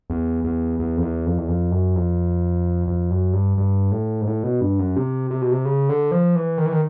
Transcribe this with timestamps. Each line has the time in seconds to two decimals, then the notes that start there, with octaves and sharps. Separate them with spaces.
0.10 E2
0.44 E2
0.80 E2
0.97 F2
1.02 E2
1.26 F2
1.38 E2
1.48 F2
1.71 F#2
1.96 F2
2.87 F2
3.11 F#2
3.33 G2
3.58 G2
3.92 A2
4.21 G#2
4.27 A2
4.43 B2
4.61 G2
4.79 F#2
4.96 C3
5.31 C3
5.42 B2
5.51 C3
5.65 C#3
5.89 D3
6.11 F3
6.36 E3
6.58 D#3
6.66 E3
6.72 D#3